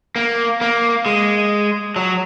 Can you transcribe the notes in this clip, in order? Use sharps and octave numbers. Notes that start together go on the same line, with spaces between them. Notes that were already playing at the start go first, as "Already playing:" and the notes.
A#3
A#3
G#3
F#3